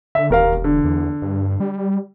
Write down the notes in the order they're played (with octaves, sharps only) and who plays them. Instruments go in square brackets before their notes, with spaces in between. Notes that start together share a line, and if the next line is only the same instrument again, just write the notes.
[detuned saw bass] D3 [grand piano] E5
[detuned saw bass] E1 [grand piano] D#2 A#4 F5
[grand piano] D3
[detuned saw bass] E2
G2
G3